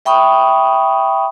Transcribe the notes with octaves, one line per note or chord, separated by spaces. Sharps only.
E5 G5 B5 C#6 D#6